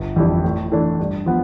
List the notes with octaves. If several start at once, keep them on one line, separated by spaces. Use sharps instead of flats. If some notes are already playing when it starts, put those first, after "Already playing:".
Already playing: G1
F2 E3 G3 D4
A2
E3 A3 D4
G2
F3 B3